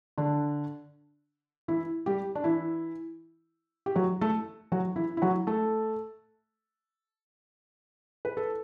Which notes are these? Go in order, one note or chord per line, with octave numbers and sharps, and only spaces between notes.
D3 D4
E3 E4
G3 G4
D4
E3 E4
G4
F#3 F#4
A3 A4
F#3 F#4
E3 E4
E4
F#3 F#4
A3 A4
B4
A4